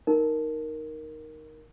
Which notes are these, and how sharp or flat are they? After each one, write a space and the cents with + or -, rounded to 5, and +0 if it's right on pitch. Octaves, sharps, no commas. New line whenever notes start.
D#4 +0 A#4 +0